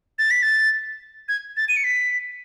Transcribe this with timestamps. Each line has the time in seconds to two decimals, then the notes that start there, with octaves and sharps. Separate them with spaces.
0.19 A6
0.31 B6
0.42 A6
1.29 G#6
1.57 A6
1.69 D#7
1.77 C#7
1.84 B6